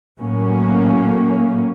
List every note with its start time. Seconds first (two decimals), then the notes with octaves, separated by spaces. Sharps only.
0.20 A2 F#3 A#3 C#4